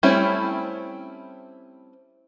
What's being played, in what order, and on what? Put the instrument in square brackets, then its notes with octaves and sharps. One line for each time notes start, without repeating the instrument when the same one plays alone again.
[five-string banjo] G3 A3 C4 C#4 E4